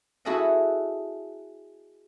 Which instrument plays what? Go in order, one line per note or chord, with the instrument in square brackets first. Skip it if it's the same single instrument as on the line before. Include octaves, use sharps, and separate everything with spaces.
[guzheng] E4 F#4 G#4 A4 D#5 F#5